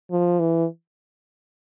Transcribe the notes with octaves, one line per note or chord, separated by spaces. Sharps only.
F3
E3